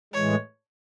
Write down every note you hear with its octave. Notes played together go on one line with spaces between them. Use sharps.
A2 E3 G#3 C#5